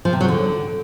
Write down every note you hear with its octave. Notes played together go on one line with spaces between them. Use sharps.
F3
C3
F#3
D3